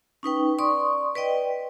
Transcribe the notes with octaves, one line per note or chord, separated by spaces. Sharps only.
C#4 D#4 B4 G5
D5 C6 C#6 D#6
B4 D5 D#5 G5